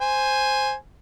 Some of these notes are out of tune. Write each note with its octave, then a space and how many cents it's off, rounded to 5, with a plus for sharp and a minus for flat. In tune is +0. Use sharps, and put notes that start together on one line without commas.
C5 +0 G#5 +0